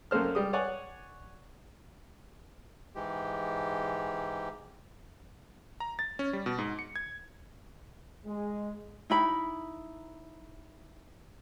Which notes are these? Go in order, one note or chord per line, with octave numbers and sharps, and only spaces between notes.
F#2 A3 A#3 C5 F6
G3 G#3 D#6
C#5 D5 F#5 G#5
G#2 E3 G#3 G4
A#5
A6
C#4
G3
B2
G#2
C#7
G#6
G#3
D#4 E4 B5